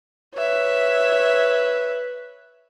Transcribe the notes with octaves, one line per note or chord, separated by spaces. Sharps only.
B4 C#5 E5